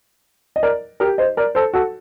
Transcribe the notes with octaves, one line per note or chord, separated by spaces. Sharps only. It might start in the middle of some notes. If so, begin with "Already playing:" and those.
D#5
A#4 D5
G4 A#4
C5 D#5
A#4 D5
A4 C5
F#4 A4